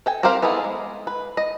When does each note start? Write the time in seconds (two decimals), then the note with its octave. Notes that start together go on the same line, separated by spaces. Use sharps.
0.06 A4 G5 G#5
0.23 C4 G4 A#4 C5 F5
0.42 B3 D#4 E4 G#4 A4
0.64 G#3
1.07 B4
1.37 D#5